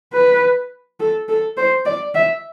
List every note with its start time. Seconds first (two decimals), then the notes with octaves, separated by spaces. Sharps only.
0.13 B4
1.00 A4
1.29 A4
1.57 C5
1.86 D5
2.14 E5